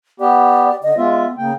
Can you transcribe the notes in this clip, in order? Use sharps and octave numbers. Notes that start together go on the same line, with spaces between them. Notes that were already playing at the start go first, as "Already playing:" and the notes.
B3 G4 D5
D3 D#5
G#3 B3 F4 E5
C#3 A#3 G5